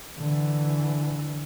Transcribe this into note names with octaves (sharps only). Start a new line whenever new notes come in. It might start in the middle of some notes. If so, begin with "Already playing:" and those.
D3 E3